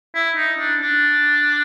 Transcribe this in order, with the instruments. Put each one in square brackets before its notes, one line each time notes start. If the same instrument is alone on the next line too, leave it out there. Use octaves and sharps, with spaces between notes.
[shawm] E4
D#4
D4
D4